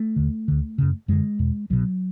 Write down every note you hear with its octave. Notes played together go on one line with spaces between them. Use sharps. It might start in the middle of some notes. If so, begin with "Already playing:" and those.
Already playing: A3
D#2 D3
D2 D3
F#2 C#3
F#2 D3 G#3
E2 B2
C2 B2 F#3